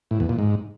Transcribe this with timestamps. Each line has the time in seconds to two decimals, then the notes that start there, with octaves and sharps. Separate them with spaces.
0.11 A2
0.20 E2
0.29 A#2
0.39 G#2